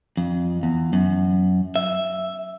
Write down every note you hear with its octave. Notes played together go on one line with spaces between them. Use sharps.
F2
E2
F#2
E5